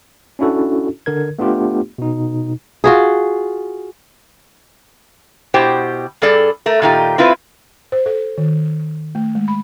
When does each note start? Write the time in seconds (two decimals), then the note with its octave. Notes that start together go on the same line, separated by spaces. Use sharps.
0.39 C#4 D4 E4 F#4 A4
1.06 D3 A#4 G#6
1.39 A3 B3 D4 F4 G4
1.98 B2 D#4
2.84 F4 F#4 G#4
5.54 B2 E4 G4 C5 G5
6.22 G2 G3 G#4 A4 D5
6.66 A3 A#4
6.82 A#2 D#3 D#4 F4 G4
7.18 C4 E4 F4 B4
7.92 C5
8.06 A4
8.38 D#3
9.15 A3
9.35 G#3
9.48 B5